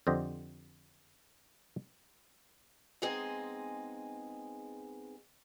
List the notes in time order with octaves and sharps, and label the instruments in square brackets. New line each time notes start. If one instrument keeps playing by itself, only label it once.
[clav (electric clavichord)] F2 D3 G4 C5 D#5
[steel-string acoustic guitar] G#3 B3 C4 D#4 G#4 D#5